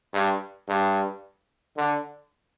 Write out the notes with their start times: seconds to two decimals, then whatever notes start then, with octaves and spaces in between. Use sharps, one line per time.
0.13 G2
0.68 G2
1.77 D3